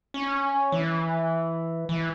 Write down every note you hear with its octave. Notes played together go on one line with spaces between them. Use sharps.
C#4
E3
E3